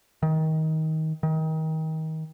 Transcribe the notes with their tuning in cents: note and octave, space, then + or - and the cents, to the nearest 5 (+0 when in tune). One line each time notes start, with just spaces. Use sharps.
D#3 +20
D#3 +30